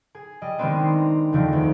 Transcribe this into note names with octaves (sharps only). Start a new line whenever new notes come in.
G#4
G3 D#5
D#3 G3 G#3 B3 C4 D4
A#5 C7
E2 D3 D#3 F3 A3
D2